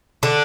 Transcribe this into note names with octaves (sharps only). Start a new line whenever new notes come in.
D3 D4